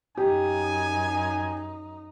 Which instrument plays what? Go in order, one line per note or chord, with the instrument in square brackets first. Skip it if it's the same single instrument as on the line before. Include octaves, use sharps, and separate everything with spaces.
[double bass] F#2 D#4 [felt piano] G4 [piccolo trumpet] G#5